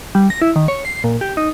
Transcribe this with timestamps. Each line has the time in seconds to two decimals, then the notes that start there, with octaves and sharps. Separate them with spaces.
0.15 G3
0.30 A#6
0.42 E4
0.56 D#3
0.68 C#5
0.85 C7
1.04 A#2
1.21 G4
1.37 D#4